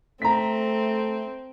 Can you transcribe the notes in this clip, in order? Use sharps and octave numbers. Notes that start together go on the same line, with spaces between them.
A3 C4 A#5 B6